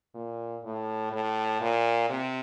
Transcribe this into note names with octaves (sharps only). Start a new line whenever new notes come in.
A#2
A2
A2
A#2
C3